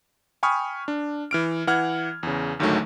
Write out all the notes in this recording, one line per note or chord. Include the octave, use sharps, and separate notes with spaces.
G5 G#5 B5 C#6 D#6 F6
D4
E3 F6 D7
E3 F#5 F6 G#6
E2 C#3
A1 D2 G#2 D#3 F#3 A3